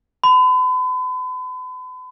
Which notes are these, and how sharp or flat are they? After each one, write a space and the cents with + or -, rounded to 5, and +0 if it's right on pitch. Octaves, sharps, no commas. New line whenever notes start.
B5 +40